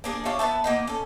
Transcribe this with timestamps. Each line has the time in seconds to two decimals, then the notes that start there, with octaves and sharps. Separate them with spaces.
0.04 A#3 D4 G#4
0.25 D4 F4 C#5 E5
0.39 B3 B4 E5 A5
0.64 A#3 B3 D#4
0.87 C#4 A4